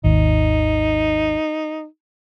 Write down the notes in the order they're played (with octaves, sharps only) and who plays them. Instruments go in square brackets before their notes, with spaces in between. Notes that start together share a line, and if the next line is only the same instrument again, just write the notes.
[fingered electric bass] G#1 D#2 [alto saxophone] D#4